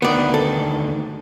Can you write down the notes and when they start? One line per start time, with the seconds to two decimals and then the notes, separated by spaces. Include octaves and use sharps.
0.02 D2 D#3 B3 D5
0.34 A4